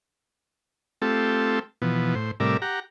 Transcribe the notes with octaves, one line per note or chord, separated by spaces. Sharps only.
A3 C4 F4 G4 A4
B2 E3 F3 B3
A2 C5
A2 C3 G3 A#4 D5 E5
G4 F#5 A#5